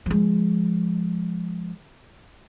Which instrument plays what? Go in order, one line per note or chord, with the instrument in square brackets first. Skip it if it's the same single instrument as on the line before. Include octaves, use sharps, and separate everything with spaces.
[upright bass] F3 G#3